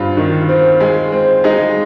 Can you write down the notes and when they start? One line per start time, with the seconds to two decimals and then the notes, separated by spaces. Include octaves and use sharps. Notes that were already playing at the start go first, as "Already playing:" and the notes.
Already playing: G2 C4 F4
0.17 D#3
0.49 C4
0.80 G#3
1.12 C4
1.44 G#3 D#4